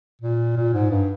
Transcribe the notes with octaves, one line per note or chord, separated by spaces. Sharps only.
A#2
A#2
G#2
G2